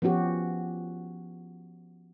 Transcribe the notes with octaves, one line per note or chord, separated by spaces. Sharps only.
F3 B3 C#4 F#4 G4